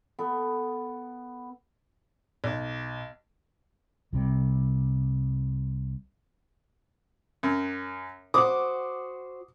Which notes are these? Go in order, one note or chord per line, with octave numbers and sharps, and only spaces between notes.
B3 A4
B1
C2 C3 F#3 G3
F#2
F#4 C5 D6 D#6